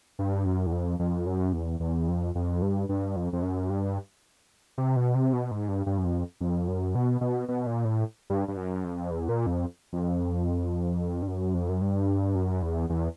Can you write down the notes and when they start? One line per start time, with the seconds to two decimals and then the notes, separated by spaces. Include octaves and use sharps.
0.19 G2
0.46 F#2
0.66 E2
0.72 F2
0.99 F2
1.26 F#2
1.53 E2
1.80 E2
2.08 F2
2.35 F2
2.62 G2
2.89 G2
3.16 F2
3.33 F2
3.42 F#2
3.70 G2
4.78 C3
4.96 B2
5.15 C3
5.33 B2
5.51 G#2
5.69 G2
5.86 G2
5.98 F#2
6.04 F2
6.41 F2
6.68 F#2
6.95 B2
7.21 B2
7.49 B2
7.67 A#2
7.85 A2
8.30 G2
8.48 G2
8.57 F#2
8.84 F2
9.11 E2
9.29 A#2
9.46 F2
9.93 F2
11.22 G2
11.28 F#2
11.54 F2
11.69 F#2
11.81 G2
12.35 F#2
12.62 E2
12.90 E2